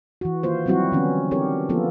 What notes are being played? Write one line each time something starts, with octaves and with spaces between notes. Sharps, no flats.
E3 F#4
D#3 A#3 F4 C5
F#3 G3 C4 E4 F#4
D3 E3 B3 C#4
C4 D4 G4 A#4 C#5
F3 A#3 B3 F4 A4